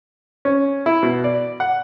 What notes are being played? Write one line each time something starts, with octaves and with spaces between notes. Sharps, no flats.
C#4
E4
B2
D5
F#5